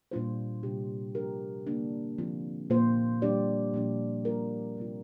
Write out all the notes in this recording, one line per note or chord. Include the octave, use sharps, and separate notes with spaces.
A#2 G3 D4 F4 C5
C3 G3 D4 G4
A#2 F3 D4 G4 A#4
D3 A#3 D4
D3 F3 C4 F4
A#2 A#3 F4 C5
G3 D4 G4 D5
A#2 F3 D4
A#2 G3 A#3 F4 A#4
C3 G3 C4 F4